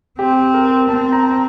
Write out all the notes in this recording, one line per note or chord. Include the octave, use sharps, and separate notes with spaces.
C4 G4
A#4
C4 A5
A#5
A#5